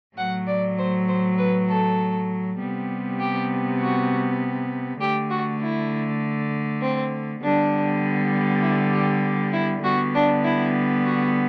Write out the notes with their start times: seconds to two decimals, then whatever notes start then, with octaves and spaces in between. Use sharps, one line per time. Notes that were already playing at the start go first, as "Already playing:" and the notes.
0.17 A2 F#3 A3 F#5
0.47 D5
0.78 C5
1.08 C5
1.38 B4
1.67 A4
2.59 C3 G3 B3
3.20 G4
3.79 F#4
5.00 D3 A3 G4
5.30 F#4
5.61 E4
6.81 C4
7.42 D3 G3 B3 D4
8.62 E4
8.93 G4
9.53 E4
9.83 D3 G3 B3 F#4
10.15 D4
10.44 E4
11.05 F#4